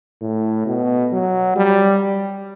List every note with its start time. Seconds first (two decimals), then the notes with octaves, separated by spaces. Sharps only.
0.21 A2
0.66 B2
1.12 F#3
1.56 G3